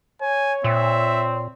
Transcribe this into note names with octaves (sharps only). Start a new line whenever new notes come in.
C#5 G#5
A#2 C4 E5